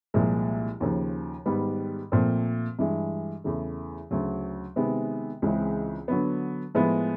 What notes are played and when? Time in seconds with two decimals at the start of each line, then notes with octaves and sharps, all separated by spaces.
0.14 C2 A#2 F3 G#3
0.80 D#2 C#3 F3
1.46 G#2 D#3 G3 B3
2.12 A#2 F3 A3 C4
2.79 G2 E3 G#3
3.44 E2 C#3 E3 A3
4.11 D2 C#3 F#3
4.76 C3 D#3 G#3 B3
5.42 C#2 C#3 E3 G#3 C4
6.08 D3 F#3 B3
6.74 A2 F3 G#3 B3